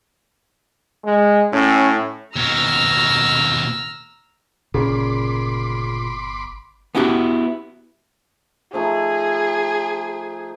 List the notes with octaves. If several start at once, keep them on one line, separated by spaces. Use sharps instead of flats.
G#3
A2 C#4
D#2 B2 A#5 E6 F6
G1 A#2 C#3 B5 C6 D6
B3 C#4 E4 F#4 G4 B4
F3 A3 D#4 G#4